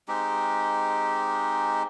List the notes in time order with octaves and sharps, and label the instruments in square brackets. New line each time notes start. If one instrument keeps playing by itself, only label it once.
[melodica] G#3 C4 D#4 G4